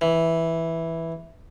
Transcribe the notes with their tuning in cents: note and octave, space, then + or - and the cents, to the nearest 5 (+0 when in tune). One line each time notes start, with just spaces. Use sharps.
E3 -5